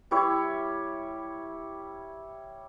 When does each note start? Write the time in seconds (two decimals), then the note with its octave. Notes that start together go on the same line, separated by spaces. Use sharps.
0.11 G3 E4 C#5